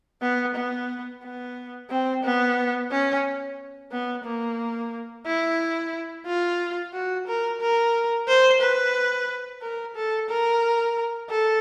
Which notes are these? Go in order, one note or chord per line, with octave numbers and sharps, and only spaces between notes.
B3
B3
B3
C4
B3
C#4
B3
A#3
E4
F4
F#4
A#4
A#4
C5
B4
A#4
A4
A#4
A4